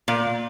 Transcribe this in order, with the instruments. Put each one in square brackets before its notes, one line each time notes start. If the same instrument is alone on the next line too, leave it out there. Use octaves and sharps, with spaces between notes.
[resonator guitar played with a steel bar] A#2